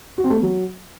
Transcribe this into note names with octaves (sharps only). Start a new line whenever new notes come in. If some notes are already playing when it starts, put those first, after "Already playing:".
F#4
C4
A3
B3
F#3